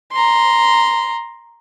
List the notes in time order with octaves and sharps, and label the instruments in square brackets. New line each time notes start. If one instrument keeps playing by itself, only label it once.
[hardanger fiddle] A#5 C6